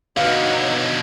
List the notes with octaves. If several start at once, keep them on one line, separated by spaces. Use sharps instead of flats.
B2 D3 B3 D#4 F#4 C#5 F5